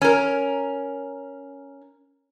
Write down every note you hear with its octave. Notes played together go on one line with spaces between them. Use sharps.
C#4 A#4